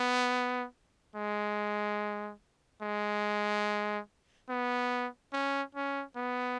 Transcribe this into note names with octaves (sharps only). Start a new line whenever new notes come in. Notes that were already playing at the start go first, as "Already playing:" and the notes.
Already playing: B3
G#3
G#3
B3
C#4
C#4
B3